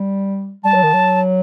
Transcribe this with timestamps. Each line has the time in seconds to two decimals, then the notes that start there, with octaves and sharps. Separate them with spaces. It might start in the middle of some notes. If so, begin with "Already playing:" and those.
Already playing: G3
0.64 G3 A5
0.74 F#3
0.83 D#3
0.94 F#3